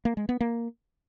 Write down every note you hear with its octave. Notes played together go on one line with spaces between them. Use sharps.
A#3
G#3
B3
A#3